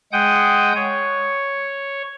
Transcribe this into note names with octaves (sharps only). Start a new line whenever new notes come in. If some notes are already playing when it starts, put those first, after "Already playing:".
G#3 F#5 G5 D#6 G6
C#5